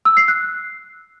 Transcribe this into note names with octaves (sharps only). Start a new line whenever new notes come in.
E6
C7
F#6